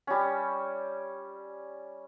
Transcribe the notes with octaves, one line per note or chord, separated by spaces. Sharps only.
G3 C#4